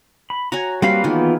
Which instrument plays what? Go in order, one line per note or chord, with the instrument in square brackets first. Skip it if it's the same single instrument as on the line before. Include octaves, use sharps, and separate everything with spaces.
[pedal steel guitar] B5
[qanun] F#4 C#5 G#5 [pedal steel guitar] A#5
[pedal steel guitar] G3 C4 F5 [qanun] A#3 F#4 B4
[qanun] D#3 G#4 [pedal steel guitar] E3 B3 F4